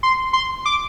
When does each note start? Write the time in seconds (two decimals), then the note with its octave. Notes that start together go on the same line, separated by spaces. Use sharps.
0.03 C6
0.33 C6
0.65 D6